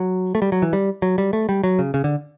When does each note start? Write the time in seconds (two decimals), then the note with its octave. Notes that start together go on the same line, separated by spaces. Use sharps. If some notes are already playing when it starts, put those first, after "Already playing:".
Already playing: F#3
0.35 A3
0.42 G3
0.52 F#3
0.62 E3
0.73 G3
1.02 F#3
1.18 G3
1.33 A3
1.49 G3
1.64 F#3
1.79 C#3
1.94 C#3
2.04 D3